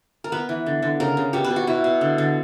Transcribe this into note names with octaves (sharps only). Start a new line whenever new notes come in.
A#4
B3 B4
E3
D3
D3
C#3 A#4
C#3
B2 G4
B4
B2
F#4
B2 E4
B2
D3
D3